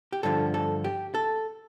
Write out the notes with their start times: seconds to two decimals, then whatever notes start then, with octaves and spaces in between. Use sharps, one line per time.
0.12 G4
0.23 G2 D3 F3 A4
0.54 A4
0.84 G4
1.14 A4